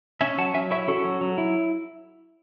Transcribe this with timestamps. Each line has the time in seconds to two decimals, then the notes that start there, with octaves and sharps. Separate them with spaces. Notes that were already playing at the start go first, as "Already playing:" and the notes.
0.21 C#4 E5 G#5
0.38 F#3 F#5 A5
0.54 F#3 E5 G#5
0.71 E4 C#5 E5
0.88 C#4 F#4 A4
1.05 F#3
1.21 F#3
1.38 E4